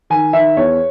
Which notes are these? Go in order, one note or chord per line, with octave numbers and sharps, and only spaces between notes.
D#3 G#5
D#3 E5
E2 C#5